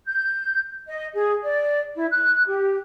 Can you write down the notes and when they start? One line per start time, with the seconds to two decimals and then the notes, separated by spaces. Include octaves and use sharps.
0.06 G6
0.87 D#5
1.14 G#4
1.43 D5
1.95 E4
2.10 F#6
2.48 G4